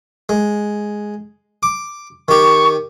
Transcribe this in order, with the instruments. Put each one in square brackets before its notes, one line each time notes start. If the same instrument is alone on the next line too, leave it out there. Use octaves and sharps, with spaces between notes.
[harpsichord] G#3
D6
[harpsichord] D#3 G4 [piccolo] C#6